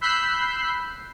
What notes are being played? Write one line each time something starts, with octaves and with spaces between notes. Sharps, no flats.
B5 E6 F#6 G6 B6 C7